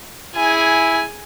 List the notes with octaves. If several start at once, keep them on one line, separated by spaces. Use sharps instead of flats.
E4 G#4 G#5